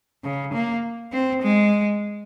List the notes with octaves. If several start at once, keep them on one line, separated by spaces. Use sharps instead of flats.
C#3
A#3
C4
G#3